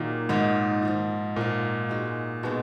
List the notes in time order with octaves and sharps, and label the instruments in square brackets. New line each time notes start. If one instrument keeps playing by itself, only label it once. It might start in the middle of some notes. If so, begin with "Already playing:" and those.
Already playing: [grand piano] A#2 [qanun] D#3 F#3 A#3 D#4 G#4
[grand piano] G#2 [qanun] D#3 F#3 A#3 D#4
[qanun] F3 A#3 F4
[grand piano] A#2 [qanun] F3 A#3 F4
[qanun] G#3 D#4 F#4
[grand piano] B2 [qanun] G#3 D#4 F#4